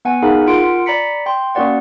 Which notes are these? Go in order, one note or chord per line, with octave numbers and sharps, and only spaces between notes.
B3 F#5 G#5
D#4 G#4 A#4 F5 F#5 B5
F4 A#4 F#5 C6 D7
D5 A#5 B5 B6 C#7
G5 C6
A#3 C#4 F#4 A#4 D5 F#5